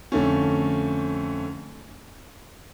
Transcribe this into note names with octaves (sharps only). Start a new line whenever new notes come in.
F2 D3 A3 C#4